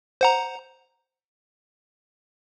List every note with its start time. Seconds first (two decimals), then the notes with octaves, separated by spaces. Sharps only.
0.21 C5 F#5 A#5